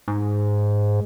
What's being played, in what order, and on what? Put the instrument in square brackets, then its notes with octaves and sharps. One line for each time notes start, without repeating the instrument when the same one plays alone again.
[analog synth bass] G#2